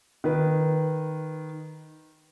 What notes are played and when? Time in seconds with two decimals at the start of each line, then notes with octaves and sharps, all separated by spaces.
0.24 D#3 B4